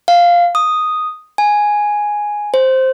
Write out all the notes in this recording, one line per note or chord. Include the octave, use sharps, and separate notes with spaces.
F5
D#6
G#5
C5